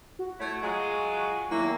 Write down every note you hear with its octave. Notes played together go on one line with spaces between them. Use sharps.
F#4
A3 E4 C#5
F#3 G#3 F4 G#5 C#6
E2 D#3 F#3 A#3 E4 F#4 E5